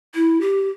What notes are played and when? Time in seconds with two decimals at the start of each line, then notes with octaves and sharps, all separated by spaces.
0.15 E4
0.41 G4